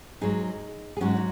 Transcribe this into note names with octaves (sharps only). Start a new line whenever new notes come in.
G#2 F#3 D#4 G#4
G#4
G#2 F#3 C#4 F#4
D#4